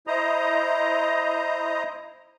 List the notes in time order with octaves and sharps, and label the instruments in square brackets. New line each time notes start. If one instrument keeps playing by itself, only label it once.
[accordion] E4 C5 D#5 A#5 D#6